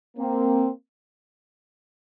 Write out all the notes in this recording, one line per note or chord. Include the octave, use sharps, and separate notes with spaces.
A#3 C4